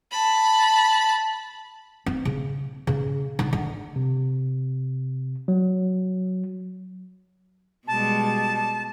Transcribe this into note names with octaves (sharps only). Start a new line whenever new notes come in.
A5 B5
C4
C#3
C#3
D3
D3
C3
F#3
B2 G3 G#3 A5